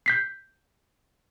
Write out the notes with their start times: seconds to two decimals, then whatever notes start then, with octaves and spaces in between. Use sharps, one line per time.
0.06 G6 B6 C7